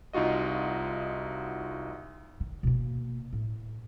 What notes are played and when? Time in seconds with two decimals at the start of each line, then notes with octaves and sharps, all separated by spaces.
0.13 C2 D#4 F4 F#4 D#5
2.40 D#3
2.63 B2 A#3
3.33 A2